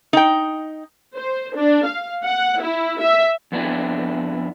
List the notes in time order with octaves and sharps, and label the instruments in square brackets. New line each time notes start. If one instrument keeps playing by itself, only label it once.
[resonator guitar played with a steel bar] D#4 G5
[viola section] C5
D4
F5
F#5
E4
E5
[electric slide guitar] F2 B3 D4 E4